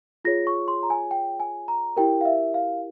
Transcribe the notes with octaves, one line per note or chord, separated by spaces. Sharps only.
F4 G#4 C#5 A#6
C#6
C6
A#5
G#5
G5
G#5
A#5
E4 G4 A#4 G5
F5
E5
F5